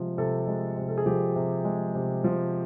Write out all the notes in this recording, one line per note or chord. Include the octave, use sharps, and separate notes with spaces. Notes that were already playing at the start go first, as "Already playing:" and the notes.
Already playing: C3 F3 G#3
C3 A4
G#3
C3
A4
G#4
F3 G4
C3
G#3
C3
F3